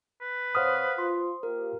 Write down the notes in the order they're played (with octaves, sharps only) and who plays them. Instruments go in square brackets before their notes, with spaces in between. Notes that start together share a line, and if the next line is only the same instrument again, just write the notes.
[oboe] B4
[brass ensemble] C3 C#5 [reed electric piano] C5 D#6 [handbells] F5 F#5 F6
[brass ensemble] F4 [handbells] C6
[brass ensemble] A#3 F4 G4 [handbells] A#4